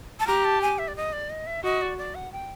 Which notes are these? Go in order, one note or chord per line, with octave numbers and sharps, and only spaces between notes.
A5
G4 A#5
A5
G#5
E5
D5
D#5
D5
D#5
E5
F#4 D#5
D5
D5
F#5
G5